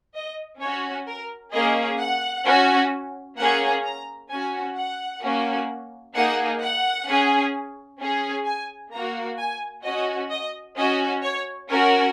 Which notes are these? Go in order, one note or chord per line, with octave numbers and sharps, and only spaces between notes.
D#5
C#4 F#4 C#5
A#4
A#3 C#4 G#4 D#5
F#5
C#4 F#4
A#3 C#4 G#4 F#5
A#5
C#4 F#4 G#5
F#5
A#3 C#4 F#4
A#3 D#4 G#4 F#5
F#5
C#4 G#4
C#4 G#4
G#5
A#3 F#4 A#5
G#5
C#4 F#4 D#5
D#5
C#4 F#4 D#5
C#5
C#4 F#4 A#4